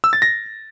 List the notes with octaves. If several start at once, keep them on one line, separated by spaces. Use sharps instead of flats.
E6
A6
A#6